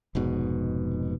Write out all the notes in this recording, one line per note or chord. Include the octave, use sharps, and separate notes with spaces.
F1 G#2 B2